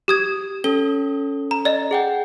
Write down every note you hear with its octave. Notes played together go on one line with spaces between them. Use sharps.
G4 D#6 G#6
C#4 A4 G7
A#5
D5 D#5
G#4 F#5 G5